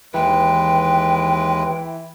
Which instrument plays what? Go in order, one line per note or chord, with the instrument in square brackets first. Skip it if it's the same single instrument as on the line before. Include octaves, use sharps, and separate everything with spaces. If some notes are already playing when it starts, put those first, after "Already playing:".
[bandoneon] D#2 G#3 B4 [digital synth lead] E3 [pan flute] G5